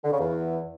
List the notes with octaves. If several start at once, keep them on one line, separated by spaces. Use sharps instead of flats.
D3
C#3
E2